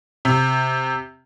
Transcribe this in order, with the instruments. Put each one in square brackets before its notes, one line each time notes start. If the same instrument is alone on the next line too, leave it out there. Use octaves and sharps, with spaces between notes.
[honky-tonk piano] C3